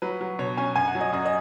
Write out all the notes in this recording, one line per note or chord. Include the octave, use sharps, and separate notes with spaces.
F#3 B4
F#3
B2 C#5
C#4 G#5
F#2 G#5
F#5
F#3
D#5
F#2 D#5
D#5